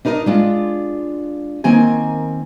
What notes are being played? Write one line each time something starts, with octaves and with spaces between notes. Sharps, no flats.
D4 D#4 A#4 C#5 D#5
G#3 D4 F4
D#3 A#3 C4 G#5